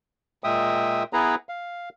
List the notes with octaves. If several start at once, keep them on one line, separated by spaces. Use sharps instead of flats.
A#2 G#3 E5 G5 D#6
B3 E4 G#4 B4 A#5
F5